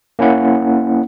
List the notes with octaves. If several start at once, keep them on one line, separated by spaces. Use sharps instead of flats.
A#3 C#4 E4 F#5